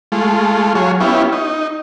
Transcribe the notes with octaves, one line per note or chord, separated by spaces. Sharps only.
G#3 A3 F4
F#3 F4 G#4 C#5
B3 C#4 E4 F4 G4
D#4